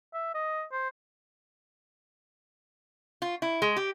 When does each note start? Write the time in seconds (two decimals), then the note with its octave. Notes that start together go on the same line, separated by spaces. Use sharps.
0.14 E5
0.34 D#5
0.72 C5
3.22 F4
3.42 E4
3.62 G#3
3.76 G4